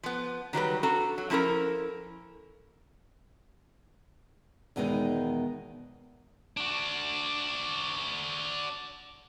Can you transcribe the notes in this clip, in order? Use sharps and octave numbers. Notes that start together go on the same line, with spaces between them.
F3 B3
D#3 F#3 G3 B4
D4 F#4 A4 A#5
F#3
F3 C#4 E4 A4 A#4
E2 B2 D#3 G#3 D#4
D4 F#4